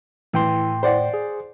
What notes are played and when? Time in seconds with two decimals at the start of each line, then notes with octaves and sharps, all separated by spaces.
0.33 A2 E3 G5 C6
0.83 C5 D5 F#5
1.14 G#4